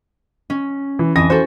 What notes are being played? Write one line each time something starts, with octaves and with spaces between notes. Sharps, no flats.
C#4
E3
F2 E3 G#5 D#6 A#6
F#4 A4 C5